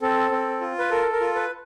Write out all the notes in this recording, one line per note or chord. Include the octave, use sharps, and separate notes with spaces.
C4 A4
C4
F4
B4
A4 A#4
A#4
F4
B4